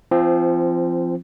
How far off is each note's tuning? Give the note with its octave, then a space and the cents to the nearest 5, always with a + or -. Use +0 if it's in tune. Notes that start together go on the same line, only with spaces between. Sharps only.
F3 -25 C4 +0